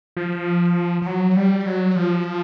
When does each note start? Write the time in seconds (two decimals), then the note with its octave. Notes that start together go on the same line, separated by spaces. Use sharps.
0.17 F3
1.02 F3
1.06 F#3
1.37 G3
1.66 F#3
1.96 F3